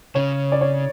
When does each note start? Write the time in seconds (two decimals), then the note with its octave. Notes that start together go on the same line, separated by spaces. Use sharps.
0.15 C#3 C#5
0.52 D5
0.61 C#5